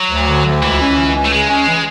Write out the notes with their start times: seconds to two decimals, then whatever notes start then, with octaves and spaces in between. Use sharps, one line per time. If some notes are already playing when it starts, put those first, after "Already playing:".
Already playing: F#3
0.11 D2
0.28 D3
0.45 D2
0.63 C#2 E3
0.81 C#4
0.97 C#2
1.15 C#4
1.25 A3
1.32 C#3 G#3
1.50 C#4
1.67 E3